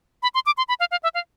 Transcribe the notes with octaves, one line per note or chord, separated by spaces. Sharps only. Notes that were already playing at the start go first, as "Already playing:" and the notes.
B5
C6
D6
C6
B5
F5
F5
E5
F5